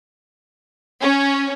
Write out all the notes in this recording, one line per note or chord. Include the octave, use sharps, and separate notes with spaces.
C#4